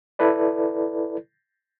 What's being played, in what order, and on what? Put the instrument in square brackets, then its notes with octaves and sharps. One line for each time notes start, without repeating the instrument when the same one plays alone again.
[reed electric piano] E4 A4 B4 D5